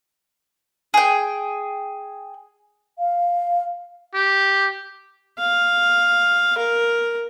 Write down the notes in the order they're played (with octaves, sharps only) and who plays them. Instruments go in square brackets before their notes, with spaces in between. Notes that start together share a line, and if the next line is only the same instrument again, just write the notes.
[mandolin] G#4 G5
[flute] F5
[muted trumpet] G4
[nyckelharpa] F5
A#4